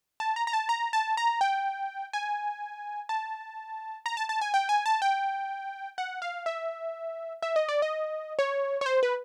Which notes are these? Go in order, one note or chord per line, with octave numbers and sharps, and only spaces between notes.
A5
A#5
A#5
A5
A#5
A5
A#5
G5
G#5
A5
A#5
A5
A5
G#5
G5
G#5
A5
G5
F#5
F5
E5
E5
D#5
D5
D#5
C#5
C#5
C5
B4